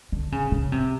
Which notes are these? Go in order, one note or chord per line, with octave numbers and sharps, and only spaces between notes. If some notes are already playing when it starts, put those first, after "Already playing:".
D3
C#3
C#3
C3